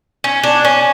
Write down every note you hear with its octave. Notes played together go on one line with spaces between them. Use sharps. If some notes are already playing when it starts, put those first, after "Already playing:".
C#4
D4
C#4